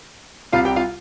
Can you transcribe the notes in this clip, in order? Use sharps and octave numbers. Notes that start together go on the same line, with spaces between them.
C2 C3 G3 F4 F5
G4 G5
F4 F5